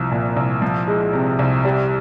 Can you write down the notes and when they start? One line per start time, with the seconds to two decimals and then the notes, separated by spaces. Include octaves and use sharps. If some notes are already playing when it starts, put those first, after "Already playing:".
Already playing: C2 F3
0.11 A#2
0.36 C2
0.62 F3
0.87 G#3
1.13 C3
1.39 C2
1.65 G3